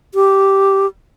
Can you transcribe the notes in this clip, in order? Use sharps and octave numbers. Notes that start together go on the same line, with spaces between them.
G4